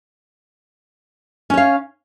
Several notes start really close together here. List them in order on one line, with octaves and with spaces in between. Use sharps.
C#4 C#5 F5